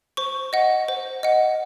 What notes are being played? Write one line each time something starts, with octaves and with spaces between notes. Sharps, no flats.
C5 C#6
D#5 F#5
C5
D#5 F#5